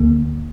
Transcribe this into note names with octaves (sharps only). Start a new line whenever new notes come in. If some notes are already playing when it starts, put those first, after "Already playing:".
Already playing: D2 D3 A#3